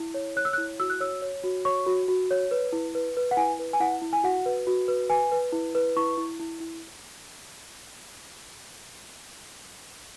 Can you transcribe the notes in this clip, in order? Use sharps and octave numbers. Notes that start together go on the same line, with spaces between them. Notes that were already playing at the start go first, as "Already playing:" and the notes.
Already playing: E4
C#5
C#5 F#6
E6
F#6
E4
F#4 E6
F#6
C#5 E6
C#5
F#4
C#5 C#6
F#4
F#4
C#5
B4
E4
B4
B4
F#5
E4 G#5
B4
G#5
E4 F#5
E4
G#5
F#4 F#5
B4
F#4
B4
B4 G#5
B4
E4
B4
E4 C#6
E4
E4
E4